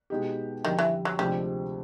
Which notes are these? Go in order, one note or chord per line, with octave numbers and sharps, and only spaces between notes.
B2 G#3 B3 D#4 G4
F2 D3 D#3 G3
E3
F#3
D2 C3 F3 G3 G#3 C4